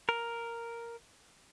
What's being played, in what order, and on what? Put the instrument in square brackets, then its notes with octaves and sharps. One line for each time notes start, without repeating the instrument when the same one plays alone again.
[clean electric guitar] A#4